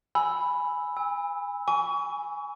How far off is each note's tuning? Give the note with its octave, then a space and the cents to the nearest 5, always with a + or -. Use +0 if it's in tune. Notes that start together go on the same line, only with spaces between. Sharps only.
G#5 +0 B5 +0 E6 +0
G#5 -35 E6 -15
G#5 +0 C#6 +35